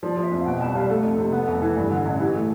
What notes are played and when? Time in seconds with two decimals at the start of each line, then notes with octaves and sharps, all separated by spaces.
0.02 F3 D5
0.17 F3
0.23 E5
0.31 F2
0.41 F5
0.46 B2 G5
0.60 C2 A5
0.75 G3 F5
0.89 A3 A4
1.04 F2
1.18 C3
1.32 B3
1.48 F1
1.62 E3
1.76 G2
1.91 D3
2.06 A1
2.20 E3 G4
2.35 A3 A4